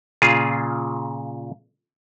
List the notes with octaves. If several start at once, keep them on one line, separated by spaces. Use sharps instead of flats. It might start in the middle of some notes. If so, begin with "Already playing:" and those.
A#2 C#3 F4 G#4